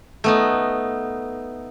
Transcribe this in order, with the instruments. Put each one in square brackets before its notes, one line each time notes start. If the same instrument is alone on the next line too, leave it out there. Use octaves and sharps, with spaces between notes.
[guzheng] A3 B3 D#4